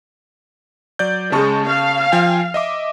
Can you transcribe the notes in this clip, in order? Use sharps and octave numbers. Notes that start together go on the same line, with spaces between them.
F#3 D5 G6
C#3 G#3 A5 C#6
F5
F3 G5 G#5
D#5 E5 D6